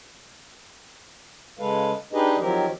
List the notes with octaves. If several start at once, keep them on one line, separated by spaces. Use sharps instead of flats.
C#3 G#3 A4 B4 F5
D4 D#4 G4 G#4 B4 D#5
D#3 F3 F#3 C4 G4 A#4